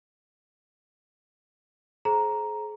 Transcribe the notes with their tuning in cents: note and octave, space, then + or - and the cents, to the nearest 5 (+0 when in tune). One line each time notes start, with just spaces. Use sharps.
G#4 +40 C5 +15 A#5 +5